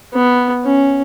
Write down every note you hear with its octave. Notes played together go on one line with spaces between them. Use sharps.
B3
C#4